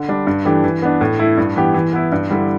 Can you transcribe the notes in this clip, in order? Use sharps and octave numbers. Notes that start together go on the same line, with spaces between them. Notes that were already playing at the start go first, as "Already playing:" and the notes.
Already playing: D3
G3 D4
G2
E3 A3 D4 G4
E3
B3 D4
A2
A3 E4
G2
E3 B3 G4
E3
B3 E4
G2
D3 G3 E4